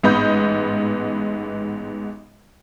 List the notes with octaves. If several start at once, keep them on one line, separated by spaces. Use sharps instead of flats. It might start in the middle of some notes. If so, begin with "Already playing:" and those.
A1 G#2 B3 D#5 B5 G6